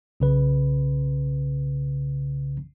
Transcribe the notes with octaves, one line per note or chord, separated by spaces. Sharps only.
B1 C#3 B4